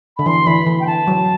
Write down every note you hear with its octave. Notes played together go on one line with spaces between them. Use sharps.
D3 B5
E3 C6
E3 B5
E3
G5
E3 A5
F#3